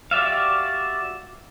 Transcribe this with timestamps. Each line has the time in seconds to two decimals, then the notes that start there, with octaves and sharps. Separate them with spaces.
0.11 F#4 G4 D5 E5 F5